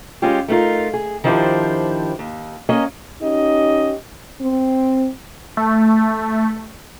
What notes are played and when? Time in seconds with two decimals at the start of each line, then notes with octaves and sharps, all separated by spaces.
0.22 G#3 C#4 F4 G4
0.48 A3 B3 D#4 F4 A#4
0.94 G#4
1.24 D#3 F3 D4 E4 G4 C5
2.19 D#2
2.69 A#3 C#4 D#5
3.22 C#4 D#4 G4 D#5
4.41 C4
5.57 A3